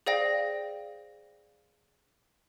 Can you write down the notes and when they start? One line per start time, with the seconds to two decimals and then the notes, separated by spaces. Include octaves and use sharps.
0.06 G#4 C5 D5 F5 G5 A#6